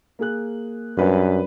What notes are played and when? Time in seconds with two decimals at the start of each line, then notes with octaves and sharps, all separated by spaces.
0.19 A#3 G#4 F#6
0.98 F#2 G3 D4 B4